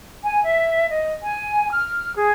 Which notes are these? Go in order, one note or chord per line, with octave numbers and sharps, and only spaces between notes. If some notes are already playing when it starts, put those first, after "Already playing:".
G#5
E5
D#5
G#5
F6
G#4